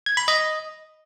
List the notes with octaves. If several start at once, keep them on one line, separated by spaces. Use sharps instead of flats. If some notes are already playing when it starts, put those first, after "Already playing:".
G#6
B5
D#5